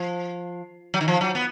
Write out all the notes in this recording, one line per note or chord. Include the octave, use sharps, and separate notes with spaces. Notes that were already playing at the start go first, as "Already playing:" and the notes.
Already playing: F3
F#3
D#3
F3
F#3
B3